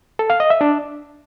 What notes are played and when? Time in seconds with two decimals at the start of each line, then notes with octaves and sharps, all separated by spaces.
0.19 A4
0.30 F5
0.40 D#5
0.50 E5
0.61 D4